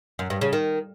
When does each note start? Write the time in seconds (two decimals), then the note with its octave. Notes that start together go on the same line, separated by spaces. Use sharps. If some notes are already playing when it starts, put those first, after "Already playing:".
0.19 F#2
0.30 G2
0.41 C#3
0.53 D#3